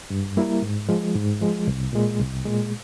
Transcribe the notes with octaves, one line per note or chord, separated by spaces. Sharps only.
G2
G3 A#3 E4 A#4
G#2
F3 G#3
G#2
F3 G#3
C2
A#2 G#3
C2
A#2 G#3